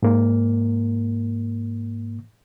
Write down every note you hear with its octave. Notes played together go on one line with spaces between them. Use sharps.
G#2 A#3